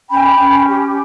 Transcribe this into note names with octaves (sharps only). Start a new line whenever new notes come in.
C#4 G5 B5
C#4
G4